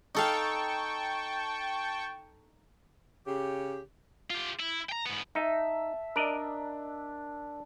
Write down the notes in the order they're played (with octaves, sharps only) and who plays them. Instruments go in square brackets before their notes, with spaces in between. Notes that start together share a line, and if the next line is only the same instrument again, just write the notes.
[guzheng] D#4 A4 F5 [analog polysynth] G5 A5 C#6
[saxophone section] C#3 G4
[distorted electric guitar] F4 G4
E4
G5 A#5
G#2 B3
[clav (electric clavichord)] D#4 [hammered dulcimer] E5 A5
[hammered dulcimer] D4 [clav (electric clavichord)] A#4 D5 D#5